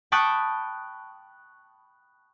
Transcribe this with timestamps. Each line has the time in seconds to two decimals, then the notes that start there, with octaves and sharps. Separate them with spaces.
0.12 G5 A5 B5 C#6 D#6 F#6